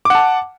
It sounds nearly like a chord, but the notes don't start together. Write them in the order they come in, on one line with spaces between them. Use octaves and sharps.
D6 F#5 A5